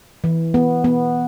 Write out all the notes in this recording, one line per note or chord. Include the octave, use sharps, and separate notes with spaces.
E3
B3
B3